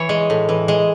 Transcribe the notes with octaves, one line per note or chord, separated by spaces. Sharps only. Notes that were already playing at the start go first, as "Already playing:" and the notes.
Already playing: E3 C#5
G#3
A2
E3
G#3